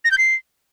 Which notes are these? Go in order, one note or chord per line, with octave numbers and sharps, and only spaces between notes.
A#6
G6
C7